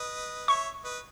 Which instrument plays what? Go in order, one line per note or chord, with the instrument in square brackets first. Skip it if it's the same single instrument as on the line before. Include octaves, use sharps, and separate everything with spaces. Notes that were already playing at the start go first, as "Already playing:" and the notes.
Already playing: [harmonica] B4 D#5
[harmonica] C#5 E5 [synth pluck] C#6
[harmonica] B4 D#5